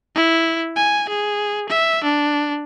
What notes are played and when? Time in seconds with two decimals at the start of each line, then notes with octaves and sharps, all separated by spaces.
0.15 E4
0.76 G#5
1.09 G#4
1.69 E5
2.04 D4